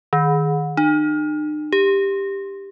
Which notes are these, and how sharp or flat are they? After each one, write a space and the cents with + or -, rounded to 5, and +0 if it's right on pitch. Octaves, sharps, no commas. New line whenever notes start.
D#3 +0
D#4 -45
G4 +10